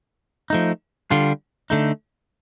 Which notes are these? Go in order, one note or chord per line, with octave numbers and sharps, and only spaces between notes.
F3 A3 D#4
D3 G3 D4 F4
D3 A3 D#4